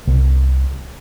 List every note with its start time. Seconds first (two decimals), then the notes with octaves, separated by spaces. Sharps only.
0.07 C2